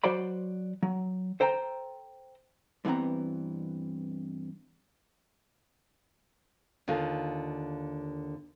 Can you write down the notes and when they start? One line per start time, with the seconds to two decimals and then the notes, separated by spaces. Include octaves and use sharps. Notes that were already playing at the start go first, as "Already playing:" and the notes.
0.04 F#3 F#4 C5 D5 B5
0.83 F#3
1.40 A4 C5 G5 A#5
2.85 G2 E3 B3 C4 A#5
6.88 D#2 D3 F4